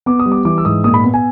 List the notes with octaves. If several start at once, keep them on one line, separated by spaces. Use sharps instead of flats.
B3 D6
D#6
G3
D6
E3 D6
E6
G#2 D#6
A#2 D#6
B5
B3
G#5